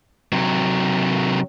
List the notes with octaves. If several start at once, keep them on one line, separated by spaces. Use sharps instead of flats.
C3 F#3